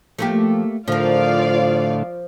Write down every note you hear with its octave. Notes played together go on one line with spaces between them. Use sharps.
F3 A3 A#3 G4
A2 D3 F3 A3 F4 A#4 D5 F5